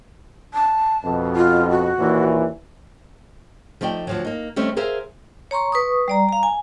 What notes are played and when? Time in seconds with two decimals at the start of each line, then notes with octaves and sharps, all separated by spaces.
0.54 A5
1.05 F2 B2
1.36 F4
1.70 F#4
1.99 D#2 A#2 E3
3.81 F3 A3 D#4 D5 G5
4.07 D2 F3 F#3
4.25 A#3 D#4
4.56 D#3 G3 A3 C4 C#4
4.77 G#4 A#4 C5 E5 F5
5.51 C#5 A#5 C6 C#6
5.72 B4 C#6 D#6
6.08 G3 D5 A#5
6.29 F5 A#5
6.43 G#5